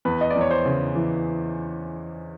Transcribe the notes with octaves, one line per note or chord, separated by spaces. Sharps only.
E2 B4
D#5
D5
E2
C#5
C5
C#3
E3